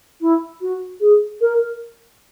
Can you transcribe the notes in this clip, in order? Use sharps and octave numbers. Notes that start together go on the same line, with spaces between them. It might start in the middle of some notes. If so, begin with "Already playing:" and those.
E4
F#4
G#4
A#4